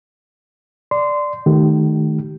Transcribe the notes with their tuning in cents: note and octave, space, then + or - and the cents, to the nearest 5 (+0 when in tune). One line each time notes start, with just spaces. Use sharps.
D5 +0 C6 -20
D#3 +0 A3 -15 G4 -35